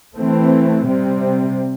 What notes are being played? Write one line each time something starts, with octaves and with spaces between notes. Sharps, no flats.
E3 A3 C4
C3 G3 C4